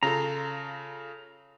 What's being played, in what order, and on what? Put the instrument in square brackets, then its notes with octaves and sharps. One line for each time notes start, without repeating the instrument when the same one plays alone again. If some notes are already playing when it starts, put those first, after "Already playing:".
[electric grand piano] C#3 F4 A4 [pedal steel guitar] A#5